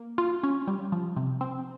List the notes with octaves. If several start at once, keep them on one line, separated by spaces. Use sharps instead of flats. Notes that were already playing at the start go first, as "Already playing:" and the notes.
Already playing: A#3
F4
C#4
G3
F3
C3
C4